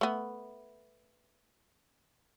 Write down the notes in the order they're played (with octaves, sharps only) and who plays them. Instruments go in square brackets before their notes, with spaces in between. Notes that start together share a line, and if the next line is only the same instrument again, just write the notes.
[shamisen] A3 B3